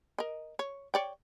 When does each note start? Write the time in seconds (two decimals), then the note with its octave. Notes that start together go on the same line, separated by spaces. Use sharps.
0.18 A#4 D#5
0.59 C#5
0.94 C#5 D5 G5